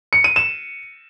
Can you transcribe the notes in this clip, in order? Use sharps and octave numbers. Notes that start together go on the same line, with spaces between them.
C#7
D#7
E7